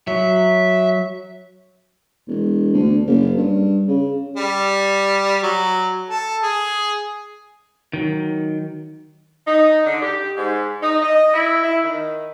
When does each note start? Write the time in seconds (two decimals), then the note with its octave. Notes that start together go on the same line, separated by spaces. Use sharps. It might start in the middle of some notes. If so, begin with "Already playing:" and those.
0.08 F#3 E5
2.28 E1
2.74 D2
3.07 F#1
3.37 G2
3.88 C#3
4.37 G3
5.43 F#3
6.10 A4
6.43 G#4
7.93 D#3 F#3
9.47 D#4
9.85 D3
10.02 G4
10.37 G#2
10.82 D#4
11.02 D#5
11.34 E4
11.62 E4
11.84 D#3